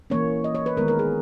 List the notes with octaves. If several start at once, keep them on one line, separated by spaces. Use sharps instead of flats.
E3 A#3 C#4 C#5
D#5
C#5
B4
D#3 G#3 B3 A#4
A#4
G#4